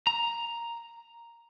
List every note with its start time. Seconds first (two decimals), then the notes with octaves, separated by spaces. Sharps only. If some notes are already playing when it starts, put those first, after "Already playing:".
0.07 A#5